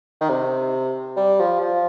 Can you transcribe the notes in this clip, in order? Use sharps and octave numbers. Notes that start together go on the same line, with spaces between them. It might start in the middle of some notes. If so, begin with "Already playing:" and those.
D#3
C3
G3
F3
F3